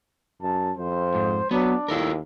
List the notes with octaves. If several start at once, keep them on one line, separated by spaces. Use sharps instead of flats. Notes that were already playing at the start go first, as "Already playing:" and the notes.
F#2 A5
F2 C5
G#2
F#3 B3 D4
D#2 E4 A4 A#4